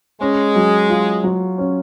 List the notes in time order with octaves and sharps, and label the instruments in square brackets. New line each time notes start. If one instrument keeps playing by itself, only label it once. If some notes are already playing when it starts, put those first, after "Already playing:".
[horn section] G#3 [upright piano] C#4
[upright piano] F#3
F4
F#3
C#4